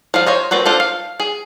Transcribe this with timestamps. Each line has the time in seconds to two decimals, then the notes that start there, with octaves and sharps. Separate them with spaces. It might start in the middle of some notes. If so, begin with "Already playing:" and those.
0.14 F3 G3 F5
0.27 C5 C#5 D#5
0.51 A#3 C4 F4 F#4 B4
0.66 D4 F4 A4 C5
0.80 F5
1.20 G#4